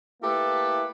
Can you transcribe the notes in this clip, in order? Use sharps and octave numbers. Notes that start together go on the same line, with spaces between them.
A3 A#3 E4 G4 A4 B4